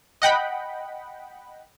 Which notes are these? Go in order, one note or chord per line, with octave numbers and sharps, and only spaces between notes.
D#5 F#5 G5 B5